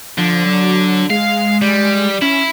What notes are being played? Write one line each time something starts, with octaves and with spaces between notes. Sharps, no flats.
D3 F3
F#3
G#3 F5
G3
C#4 E4